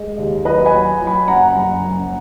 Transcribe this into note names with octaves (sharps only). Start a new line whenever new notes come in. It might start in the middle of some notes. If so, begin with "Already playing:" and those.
Already playing: G#3 D#5
D#2
F#3 B4 D#5
G#5 B5
F#3
F#3
G#5 B5
F#1 F#5 A#5
F#2
F#1